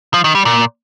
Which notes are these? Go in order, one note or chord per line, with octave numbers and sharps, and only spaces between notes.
F3
D#3
G3
A#2